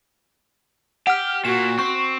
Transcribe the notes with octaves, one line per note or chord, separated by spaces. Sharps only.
G4 F#5 F6
A#2 F#4 E7
C4 C#6